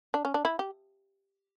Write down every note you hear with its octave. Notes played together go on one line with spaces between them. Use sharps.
D4
C#4
D4
E4
G4